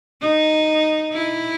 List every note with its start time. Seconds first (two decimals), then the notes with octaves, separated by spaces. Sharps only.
0.22 D#4
1.13 E4